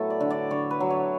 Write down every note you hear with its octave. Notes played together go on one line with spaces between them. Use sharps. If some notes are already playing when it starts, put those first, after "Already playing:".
Already playing: A2 F#3 A3 B3 A4 B4
D5
D3
D5
D3 C#5
B4
F#3
C#5